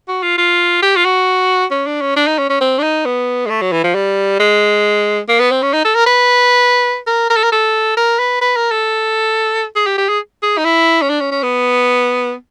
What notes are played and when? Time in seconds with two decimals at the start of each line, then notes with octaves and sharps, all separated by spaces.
0.08 F#4
0.23 F4
0.38 F4
0.82 G4
0.96 F4
1.05 F#4
1.71 C#4
1.87 D4
2.01 C#4
2.16 D4
2.27 D#4
2.38 C#4
2.50 C#4
2.61 C4
2.79 D4
2.83 D#4
3.06 B3
3.46 G#3
3.50 A3
3.62 F#3
3.73 E3
3.84 F3
3.95 G3
4.40 G#3
5.29 A#3
5.40 B3
5.51 C4
5.62 C#4
5.73 D#4
5.85 A4
5.95 A#4
6.07 B4
7.07 A#4
7.30 A#4
7.37 A4
7.44 A#4
7.52 A4
7.97 A#4
8.19 B4
8.41 B4
8.56 A#4
8.71 A4
9.76 G#4
9.87 G4
9.98 G4
10.09 G#4
10.43 G#4
10.58 D#4
10.65 E4
11.02 C#4
11.09 D4
11.21 C#4
11.32 C#4
11.43 B3